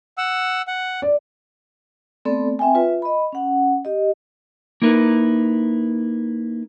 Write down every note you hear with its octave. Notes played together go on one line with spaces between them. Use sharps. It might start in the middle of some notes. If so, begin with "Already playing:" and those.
F#5 E6
F#5
D5
A3 B3 C4 A4 D5
C4 E5 G5 G#5
F4 B4 E5
D#5 B5
C#4 F#5
G4 D#5
A#3 D#4 E4 A#4 B4